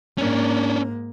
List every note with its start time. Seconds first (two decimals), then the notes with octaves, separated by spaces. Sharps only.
0.18 G#2 A#3 C#4 D4